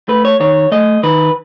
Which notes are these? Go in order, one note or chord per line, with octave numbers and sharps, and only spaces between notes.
A3 B4
C#5
D#3 C#5
A3 D#5
D#3 B4